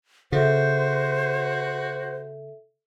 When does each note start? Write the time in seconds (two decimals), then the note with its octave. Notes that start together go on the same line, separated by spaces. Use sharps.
0.32 C#3 F#4 A4 C5 E5